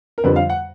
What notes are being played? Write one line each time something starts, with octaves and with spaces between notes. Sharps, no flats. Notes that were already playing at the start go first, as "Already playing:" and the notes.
A#4
F2 D3 G3 B4
F5
F#5